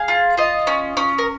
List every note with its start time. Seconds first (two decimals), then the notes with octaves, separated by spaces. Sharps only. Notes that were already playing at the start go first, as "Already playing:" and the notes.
Already playing: G#4 F5
0.08 F4
0.37 F4 D#5
0.67 C#4
0.97 C#4
1.18 A#4